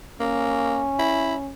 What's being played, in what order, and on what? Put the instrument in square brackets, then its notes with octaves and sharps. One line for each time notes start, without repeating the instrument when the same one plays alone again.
[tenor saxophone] A#3 [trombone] C#4
[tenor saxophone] E4